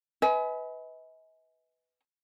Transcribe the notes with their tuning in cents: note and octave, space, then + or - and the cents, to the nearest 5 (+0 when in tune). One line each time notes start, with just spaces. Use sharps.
B4 +10 D#5 +45 G#5 +20